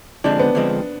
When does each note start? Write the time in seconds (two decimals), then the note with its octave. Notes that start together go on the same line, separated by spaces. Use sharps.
0.24 D3 F3 G#3 C4 D4
0.40 B3
0.55 D3 F3 G#3 C4